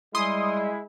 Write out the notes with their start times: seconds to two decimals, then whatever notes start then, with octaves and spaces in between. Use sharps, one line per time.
0.15 G3 G#3 E4 C6 D#6